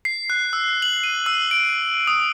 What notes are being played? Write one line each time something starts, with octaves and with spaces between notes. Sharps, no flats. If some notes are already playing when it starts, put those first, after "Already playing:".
C7
F#6
E6
F#7
D#7
E6
D7
D#6